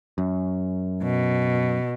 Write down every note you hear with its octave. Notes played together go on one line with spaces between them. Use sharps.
F#2
B2